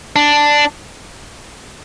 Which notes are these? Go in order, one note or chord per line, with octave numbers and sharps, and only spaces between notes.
D4